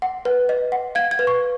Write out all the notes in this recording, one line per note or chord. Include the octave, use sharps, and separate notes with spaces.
F#5
B4
D#5
F#5
F5 G#6
G#6
B4
C#6